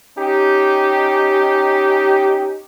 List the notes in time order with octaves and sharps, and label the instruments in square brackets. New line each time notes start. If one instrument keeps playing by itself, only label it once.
[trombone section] C#4 D#4 G4